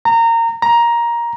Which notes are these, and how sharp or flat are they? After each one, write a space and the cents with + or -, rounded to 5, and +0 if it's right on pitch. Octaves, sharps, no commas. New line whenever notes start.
A#5 -20
A#5 +15